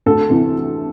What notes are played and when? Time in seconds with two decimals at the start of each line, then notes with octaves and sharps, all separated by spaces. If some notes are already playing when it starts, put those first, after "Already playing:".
0.06 D2 A4
0.30 C3 E3